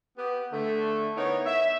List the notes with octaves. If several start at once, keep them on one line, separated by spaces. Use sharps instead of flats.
B3 G4
D3 A3
B3 D#4 E4 A#4 C#5
E5